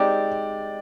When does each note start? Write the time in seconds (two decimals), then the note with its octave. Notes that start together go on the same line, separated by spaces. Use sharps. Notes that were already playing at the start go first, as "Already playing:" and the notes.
Already playing: G#3 C4 D#4 G4 D5